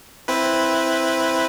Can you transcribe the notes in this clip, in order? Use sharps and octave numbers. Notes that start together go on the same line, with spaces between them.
C4 E4 B4